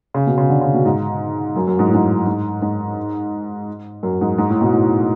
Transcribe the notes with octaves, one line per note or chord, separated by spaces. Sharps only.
C#3
B2
C#3
D3
C#3
B2
G#2
F#2
F#2
G#2
A2
G#2
G#2
G#2
F#2
G#2
G#2
A2
B2
A2